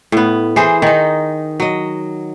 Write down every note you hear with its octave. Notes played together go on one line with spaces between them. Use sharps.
A2 B3
E3 G#4 C5
D#3 D#4
F#3 D#5